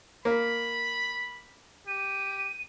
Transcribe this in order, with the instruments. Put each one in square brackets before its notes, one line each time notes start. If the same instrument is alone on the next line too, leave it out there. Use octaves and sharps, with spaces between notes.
[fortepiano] A#3 [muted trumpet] B5
[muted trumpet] G4 [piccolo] D#7